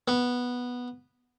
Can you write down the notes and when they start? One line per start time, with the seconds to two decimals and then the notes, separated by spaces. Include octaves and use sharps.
0.08 B3